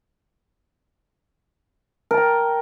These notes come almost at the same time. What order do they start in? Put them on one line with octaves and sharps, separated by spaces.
A#4 A5 G5